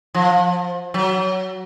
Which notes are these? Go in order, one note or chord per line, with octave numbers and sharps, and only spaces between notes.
F3
F#3